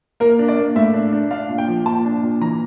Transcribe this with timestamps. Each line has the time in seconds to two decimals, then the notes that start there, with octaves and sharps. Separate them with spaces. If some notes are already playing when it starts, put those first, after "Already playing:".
0.20 A#3 A#4
0.39 D4
0.48 D5
0.57 A#3
0.76 A2 E5
0.94 D4
1.13 D4
1.31 D4 F5
1.49 A#2
1.58 G5
1.68 F3
1.86 A#2 A5
2.05 D4
2.23 A#2
2.41 E3 A#5